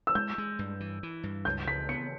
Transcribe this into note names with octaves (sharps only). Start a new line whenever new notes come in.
E6
G#3 G6
G#3
G2
E3
E3
G2
C#2 G6
C#3 B6
B3 C#7